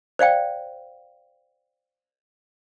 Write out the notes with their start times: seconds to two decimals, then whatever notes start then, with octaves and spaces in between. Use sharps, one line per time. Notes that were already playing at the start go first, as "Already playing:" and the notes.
0.19 C5 D5 F5 G5